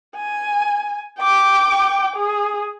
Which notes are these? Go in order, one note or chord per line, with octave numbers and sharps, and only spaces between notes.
G#5
G5 D6
G#4